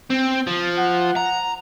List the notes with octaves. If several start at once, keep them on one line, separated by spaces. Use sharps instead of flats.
C4
F3
F#5
A#5